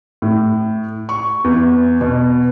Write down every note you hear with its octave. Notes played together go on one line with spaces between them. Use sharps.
A2
C#6
E2
B2